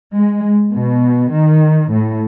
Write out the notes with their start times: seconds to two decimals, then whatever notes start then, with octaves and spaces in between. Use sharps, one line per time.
0.14 G#3
0.72 B2
1.32 D#3
1.91 A2